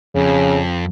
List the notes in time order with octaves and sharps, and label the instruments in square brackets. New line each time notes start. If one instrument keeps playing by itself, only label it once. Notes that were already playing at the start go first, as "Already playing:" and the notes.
[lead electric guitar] F2 [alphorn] C#3